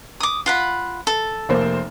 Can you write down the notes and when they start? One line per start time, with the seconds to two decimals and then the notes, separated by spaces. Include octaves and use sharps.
0.20 D6 D#6
0.46 F4 F#5 B5
1.07 A4
1.49 F1 A#3 C5